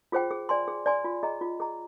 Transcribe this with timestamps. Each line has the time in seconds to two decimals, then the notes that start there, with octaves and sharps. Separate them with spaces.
0.12 F4 G#4 C5 G5
0.31 G#4
0.49 D5 G#5 C6
0.68 G#4
0.86 D5 G#5 C6
1.04 F4
1.23 G#4 D#5 A#5
1.41 F4
1.60 G#4 D#5 A#5